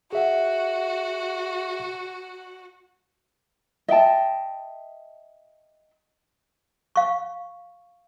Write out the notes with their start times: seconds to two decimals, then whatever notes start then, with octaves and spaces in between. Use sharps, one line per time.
0.13 F#4 G#4 E5 F#5
3.88 D#5 E5 G5 A5
6.96 F5 C#6